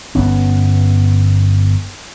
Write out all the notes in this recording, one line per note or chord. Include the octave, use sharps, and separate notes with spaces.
G1 B3 C#4